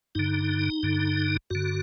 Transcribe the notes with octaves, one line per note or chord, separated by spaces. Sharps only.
G2 D3 D#4
G2 D3
G2 D3 F#4